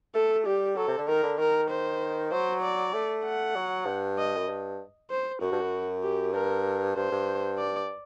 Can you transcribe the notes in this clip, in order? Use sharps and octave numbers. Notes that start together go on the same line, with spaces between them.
A3 A4
G3 G4
F#3 A4
C3
D3
D#3 A#4
D3
D#3 A#4
C5
F#3 C5
D5
A3
F#5
F#3
G2
D#5
F#2
G2
C5
F#2 F#4
G2
F#2
G4
G2 A#4
G2 C5
G2
D5